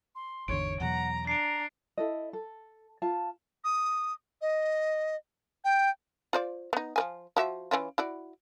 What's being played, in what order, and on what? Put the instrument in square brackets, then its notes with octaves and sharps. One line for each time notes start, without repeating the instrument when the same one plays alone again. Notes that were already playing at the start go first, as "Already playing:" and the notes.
[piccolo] C6
[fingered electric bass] G#1 E2 D3 [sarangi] C#5 [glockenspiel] D7
[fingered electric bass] E2 B2 F#3 [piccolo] F#5 [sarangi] A#5
[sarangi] D4 [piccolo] A#5 [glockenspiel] C7 D7
[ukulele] E4 A4 D#5
A4
F4 A5
[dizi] D#6
D#5
G5
[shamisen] F4 C5 D5
B3 D#4
F3 B4 G#5
F3 F#4 E5
E3 C#4 F4
E4 F#4 D5